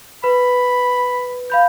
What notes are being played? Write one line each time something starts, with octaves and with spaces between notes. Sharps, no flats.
B4 B5
F5 B5 G6